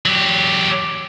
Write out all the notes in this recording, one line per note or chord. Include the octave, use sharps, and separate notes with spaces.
F#3 G4